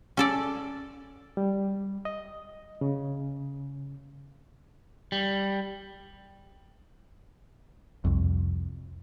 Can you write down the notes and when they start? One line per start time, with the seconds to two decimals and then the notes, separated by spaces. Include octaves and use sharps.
0.17 C#4 A4 D5
1.37 G3
2.05 D#5
2.81 C#3
5.12 G3
8.04 C2 F2